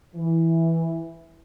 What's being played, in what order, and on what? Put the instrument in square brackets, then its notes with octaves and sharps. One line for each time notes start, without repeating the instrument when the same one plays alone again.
[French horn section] E3